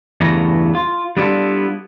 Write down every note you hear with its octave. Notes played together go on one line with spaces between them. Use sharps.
E2 G2 C#3 E3 A3 A#5
F4
G3 B3 D4 E4 F4 A4